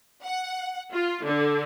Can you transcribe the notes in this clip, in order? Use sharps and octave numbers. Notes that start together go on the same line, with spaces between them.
F#5
F4
D3